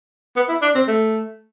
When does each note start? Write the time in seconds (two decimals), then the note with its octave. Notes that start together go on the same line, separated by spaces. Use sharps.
0.36 B3
0.49 E4
0.62 D4
0.75 C4
0.88 A3